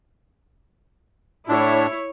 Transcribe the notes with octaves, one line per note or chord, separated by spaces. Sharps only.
A2 D4 E4 C#5